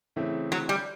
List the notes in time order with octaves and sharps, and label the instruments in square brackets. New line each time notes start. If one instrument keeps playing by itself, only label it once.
[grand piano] C#3 E3 A3 C4
[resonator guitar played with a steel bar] F#3
G3